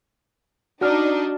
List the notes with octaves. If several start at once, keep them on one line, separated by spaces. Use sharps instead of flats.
D4 D#4 F#4 F6